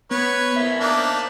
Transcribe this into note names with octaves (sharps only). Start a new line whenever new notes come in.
B3 B4 C#5
A#4 C5 E5
A#3 D4 D#4